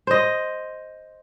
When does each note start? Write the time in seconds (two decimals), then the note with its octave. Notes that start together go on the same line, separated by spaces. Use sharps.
0.07 C5 D#5